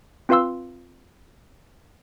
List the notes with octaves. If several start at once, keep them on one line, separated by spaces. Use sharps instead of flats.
C4 F4 B4 F5 C6 E6